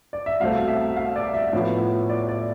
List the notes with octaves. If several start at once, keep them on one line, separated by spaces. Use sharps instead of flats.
D5
E5
C2 B2 A3 C4 F5
E5
F5
D5
E5
A2 F3 B3
D5
D5